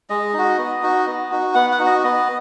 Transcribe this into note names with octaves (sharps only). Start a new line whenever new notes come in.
G#3 D#5
D#4 F#4
B3
D#4 F#4
B3
D#4 F#4
B3 F#5
F#5
D#4 F#4
D#5
B3 D#5